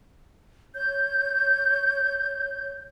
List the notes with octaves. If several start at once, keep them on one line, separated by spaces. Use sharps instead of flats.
C#5 G6